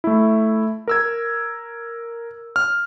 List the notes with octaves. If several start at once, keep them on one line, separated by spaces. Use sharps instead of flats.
A3 E4
A#4 E6 G#6
F6